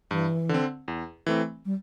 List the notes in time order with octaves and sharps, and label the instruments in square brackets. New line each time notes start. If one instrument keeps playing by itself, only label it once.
[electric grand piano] G2 [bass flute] E3
[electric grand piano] D3 C4
E2
E3 A3 C4
[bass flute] G3